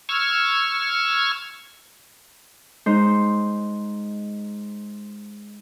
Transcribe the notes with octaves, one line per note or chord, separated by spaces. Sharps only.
C#6 E6 F6 G#6
G#3 D#4 C5